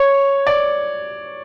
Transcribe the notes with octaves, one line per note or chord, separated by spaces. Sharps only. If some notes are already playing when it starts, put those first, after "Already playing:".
Already playing: C#5
D5